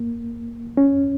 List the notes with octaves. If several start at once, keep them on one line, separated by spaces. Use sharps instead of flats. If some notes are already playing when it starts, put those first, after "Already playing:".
Already playing: A#3
C#4